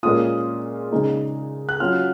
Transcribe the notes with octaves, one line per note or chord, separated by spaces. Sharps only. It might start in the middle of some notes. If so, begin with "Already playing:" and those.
A#2 G#3 C#4 F4 D#6
C#3 G#3 D#4
F#6
F#3 C#4 F4 F6